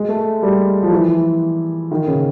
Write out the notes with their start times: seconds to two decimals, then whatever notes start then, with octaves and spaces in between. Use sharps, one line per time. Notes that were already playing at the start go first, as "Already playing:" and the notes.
Already playing: G#3
0.09 A3
0.43 G3
0.83 F3
0.92 E3
1.91 D#3
2.07 C#3